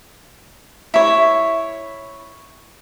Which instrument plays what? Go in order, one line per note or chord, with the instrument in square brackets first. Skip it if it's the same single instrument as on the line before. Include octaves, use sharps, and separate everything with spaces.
[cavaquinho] E4 C#5